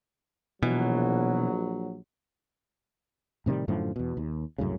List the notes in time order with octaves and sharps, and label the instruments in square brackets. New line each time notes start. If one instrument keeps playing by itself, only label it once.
[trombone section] A#1 F#3 [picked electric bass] B2 E3
[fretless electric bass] A2 C3 D#3 G3
F#2 A2 D3 F3
E2 B2
D#2
C2 F#2 A2 C#3